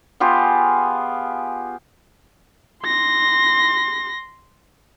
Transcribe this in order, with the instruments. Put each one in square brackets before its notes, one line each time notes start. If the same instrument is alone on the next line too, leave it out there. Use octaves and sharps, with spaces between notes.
[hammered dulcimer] B3 F4 G4 G#4
[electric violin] C6 A#6